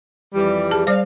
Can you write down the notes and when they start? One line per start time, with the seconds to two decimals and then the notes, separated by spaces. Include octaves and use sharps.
0.34 F2 E3 G3
0.71 G#4 A5
0.87 G3 C5 D5 F5